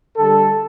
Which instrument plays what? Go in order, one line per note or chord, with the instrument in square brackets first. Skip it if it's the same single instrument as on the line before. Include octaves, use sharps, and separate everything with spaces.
[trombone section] D3 G3 A4